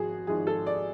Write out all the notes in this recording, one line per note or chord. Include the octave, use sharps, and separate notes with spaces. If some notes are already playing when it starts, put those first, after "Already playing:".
Already playing: G#1 F3 F#4 G#4
G#1 G#2 F3 G#4
A4
D5